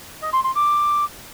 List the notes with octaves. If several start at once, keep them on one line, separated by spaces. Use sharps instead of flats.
D#5
C6
C6
D6